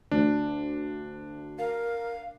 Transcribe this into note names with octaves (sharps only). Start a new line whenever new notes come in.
D2 D4
A#4 F5